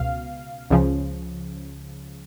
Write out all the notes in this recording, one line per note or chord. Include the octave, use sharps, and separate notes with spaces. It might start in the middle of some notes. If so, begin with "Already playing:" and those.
Already playing: C#2 B2 F5
C#2 C#3 F3